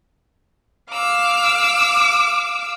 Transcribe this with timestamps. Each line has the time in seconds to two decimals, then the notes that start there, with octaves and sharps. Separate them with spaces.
0.90 F5 D6 E6